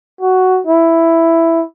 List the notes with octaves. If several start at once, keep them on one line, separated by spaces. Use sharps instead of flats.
F#4
E4